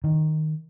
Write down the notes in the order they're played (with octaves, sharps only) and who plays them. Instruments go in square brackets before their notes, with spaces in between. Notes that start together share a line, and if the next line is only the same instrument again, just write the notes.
[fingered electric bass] D#3